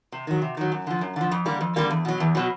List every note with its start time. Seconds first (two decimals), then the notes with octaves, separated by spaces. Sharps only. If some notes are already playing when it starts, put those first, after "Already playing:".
0.12 C3
0.27 D#3 F#3
0.42 C3
0.57 D#3 F#3
0.72 F#2
0.87 D3 F3
1.01 F#2
1.16 D3 F3
1.32 F2
1.46 D3 G3 A#3
1.61 F2
1.76 D3 G3 A#3
1.91 E2
2.05 B2 F#3
2.20 E2
2.35 B2 F#3